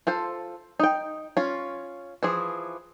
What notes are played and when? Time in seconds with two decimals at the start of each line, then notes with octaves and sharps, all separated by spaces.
0.07 F4 A4 C5
0.79 D#4 G5
1.37 C#4 F4
2.23 E3 F3 G#4